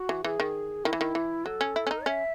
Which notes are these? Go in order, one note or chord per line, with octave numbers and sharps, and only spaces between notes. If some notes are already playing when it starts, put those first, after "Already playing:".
Already playing: F#4
E3
E3 G#4
D#3
D#3 E4
E3
D#3
E3
F#3 A4
C#4
E4
C#4
D#4
C#4 E5